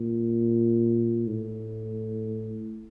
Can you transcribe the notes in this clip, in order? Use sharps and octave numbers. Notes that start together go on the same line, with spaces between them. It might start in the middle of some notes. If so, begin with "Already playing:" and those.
Already playing: A#2
A2